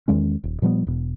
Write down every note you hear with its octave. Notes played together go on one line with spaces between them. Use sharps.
E2 D#3 G#3 C#4
D#1
A#2 F3 G3 B3
E1 B2